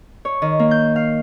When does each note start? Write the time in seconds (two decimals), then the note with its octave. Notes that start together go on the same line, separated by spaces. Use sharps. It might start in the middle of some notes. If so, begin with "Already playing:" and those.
0.25 C#5
0.42 D#3
0.59 A#3
0.71 G6
0.96 F5